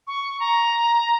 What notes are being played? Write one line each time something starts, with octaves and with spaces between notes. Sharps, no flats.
C#6
A#5